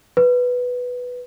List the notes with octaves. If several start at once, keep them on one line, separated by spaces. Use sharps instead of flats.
B4